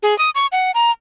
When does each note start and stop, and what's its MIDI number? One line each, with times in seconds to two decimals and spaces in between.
0.03 0.17 68
0.19 0.30 87
0.35 0.46 85
0.52 0.71 78
0.75 0.91 82